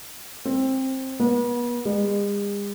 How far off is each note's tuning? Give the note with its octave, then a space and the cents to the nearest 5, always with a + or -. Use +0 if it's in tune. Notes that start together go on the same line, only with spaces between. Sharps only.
C4 +15
B3 -40
G#3 -45